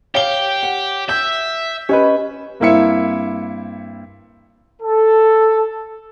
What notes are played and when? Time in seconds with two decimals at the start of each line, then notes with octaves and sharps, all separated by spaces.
0.15 G4 C#5 F5 G7
0.63 F#5
1.09 E5 G6
1.89 C#4 G4 B4 D#5
2.60 G2 A#3 C4 E4 E5 C#7
4.82 A4